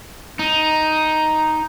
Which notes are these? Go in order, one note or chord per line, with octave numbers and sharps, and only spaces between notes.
D#4